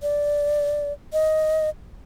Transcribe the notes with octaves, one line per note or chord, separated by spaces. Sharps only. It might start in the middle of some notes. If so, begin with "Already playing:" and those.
D5
D#5